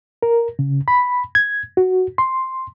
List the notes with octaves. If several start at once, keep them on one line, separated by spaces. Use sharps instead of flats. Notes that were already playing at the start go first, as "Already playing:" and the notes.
A#4
C#3
B5
G#6
F#4
C6